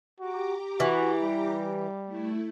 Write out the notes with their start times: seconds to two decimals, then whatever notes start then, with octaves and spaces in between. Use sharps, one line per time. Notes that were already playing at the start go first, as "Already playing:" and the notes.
0.20 F#4 G4 A#5 D6
0.80 E3 F#4
1.23 G3
2.05 A3 E4